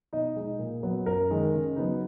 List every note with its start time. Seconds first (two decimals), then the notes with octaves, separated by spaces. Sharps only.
0.13 B2 D#4 D#5
0.36 G#3 D#4
0.59 A#2
0.83 F#3 B3
1.06 F#2 A#4
1.30 D#3 G#3 D#4
1.54 C#3
1.76 F#3 B3 D#4